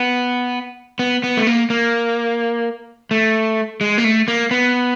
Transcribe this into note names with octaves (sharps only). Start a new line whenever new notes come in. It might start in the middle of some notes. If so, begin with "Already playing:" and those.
Already playing: B3
B3
B3
A3
A#3
A#3
A3
G#3
A#3
A3
A#3
B3